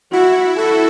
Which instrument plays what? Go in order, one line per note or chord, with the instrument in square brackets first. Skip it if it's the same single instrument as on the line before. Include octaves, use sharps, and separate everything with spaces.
[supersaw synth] E4 [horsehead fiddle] F#4
[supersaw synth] F#4 [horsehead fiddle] A4